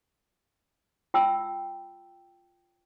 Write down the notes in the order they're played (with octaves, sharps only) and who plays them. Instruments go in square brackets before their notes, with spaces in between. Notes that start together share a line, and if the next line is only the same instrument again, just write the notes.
[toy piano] F4 G5 A5 E6